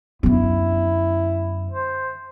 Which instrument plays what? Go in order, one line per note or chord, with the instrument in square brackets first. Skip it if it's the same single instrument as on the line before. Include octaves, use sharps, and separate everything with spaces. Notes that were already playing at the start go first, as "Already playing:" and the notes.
[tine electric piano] F#2 [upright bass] D3 B3 [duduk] E4
[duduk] C5